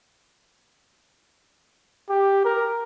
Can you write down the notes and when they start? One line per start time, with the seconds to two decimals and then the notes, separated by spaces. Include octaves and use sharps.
2.09 G4
2.45 A#4